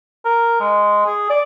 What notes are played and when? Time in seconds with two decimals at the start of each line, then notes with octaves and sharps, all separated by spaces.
0.25 A#4
0.60 G#3
1.06 G#4
1.30 D5